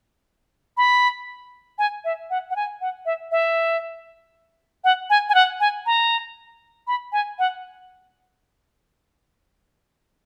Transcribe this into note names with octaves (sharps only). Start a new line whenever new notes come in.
B5
G#5
E5
F#5
F#5
G#5
F#5
E5
E5
F#5
G#5
G#5
F#5
G#5
A#5
B5
G#5
F#5